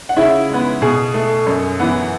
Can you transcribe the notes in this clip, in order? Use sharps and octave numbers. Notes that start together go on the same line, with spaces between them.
F#5
C#3 E4 E5
G#3 B3
B2 G#4
A3
F#2
E3 B3